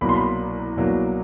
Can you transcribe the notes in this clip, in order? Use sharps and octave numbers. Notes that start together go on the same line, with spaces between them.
C2 B2 F#3 A#3 B5
C6
B5
C2 B2 F#3 A#3